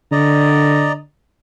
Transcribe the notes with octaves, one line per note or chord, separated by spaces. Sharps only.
D3 D5 D#5 A#5